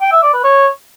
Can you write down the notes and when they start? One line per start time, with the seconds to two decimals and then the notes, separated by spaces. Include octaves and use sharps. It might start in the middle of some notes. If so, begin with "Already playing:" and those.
0.01 G5
0.12 E5
0.23 D5
0.33 B4
0.44 C#5